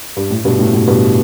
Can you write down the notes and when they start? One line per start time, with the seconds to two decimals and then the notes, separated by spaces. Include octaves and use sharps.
0.17 G2
0.30 A2
0.45 G2 B2
0.59 A2
0.73 A2
0.87 G2 B2